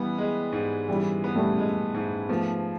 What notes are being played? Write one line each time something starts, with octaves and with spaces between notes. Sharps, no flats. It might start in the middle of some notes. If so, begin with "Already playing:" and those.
Already playing: E3 G3 B3
G#3
G#2
E3 G3
B3
G3 A3
G#3
G#2
F3 A3 B3